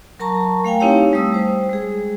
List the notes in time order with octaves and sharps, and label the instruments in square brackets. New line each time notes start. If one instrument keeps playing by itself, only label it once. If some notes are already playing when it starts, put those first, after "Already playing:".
[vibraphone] F#3 A#4 A5 A#5 C#6
A3 F5 G5 G#5
C4 D#4 E4 G4 C#5 F5
G3 A3 D#6 E6
G3 C5
G#3 G#4